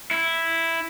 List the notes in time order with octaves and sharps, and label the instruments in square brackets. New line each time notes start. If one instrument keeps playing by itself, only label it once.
[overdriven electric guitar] E4